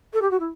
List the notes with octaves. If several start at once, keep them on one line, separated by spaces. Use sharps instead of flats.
A4
G4
F#4
E4